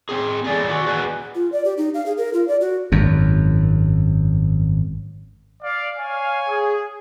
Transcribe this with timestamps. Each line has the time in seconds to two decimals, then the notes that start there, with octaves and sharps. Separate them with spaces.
0.09 C4 G#4
0.44 G#4 A4 D5 G5 G#5
0.68 F#4 D5
0.86 F#4 G#4 B4
1.35 F4
1.52 D5
1.65 G4
1.78 D#4
1.94 F5
2.06 G#4
2.18 A#4
2.33 F4
2.48 D5
2.61 F#4
2.92 G#1 F#2
5.62 D5 F5
5.97 C#5 F5 G#5
6.49 G#4